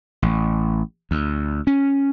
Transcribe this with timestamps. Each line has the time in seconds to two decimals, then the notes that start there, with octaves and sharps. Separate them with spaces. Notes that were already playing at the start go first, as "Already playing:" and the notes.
0.22 A1
1.11 D2
1.67 C#4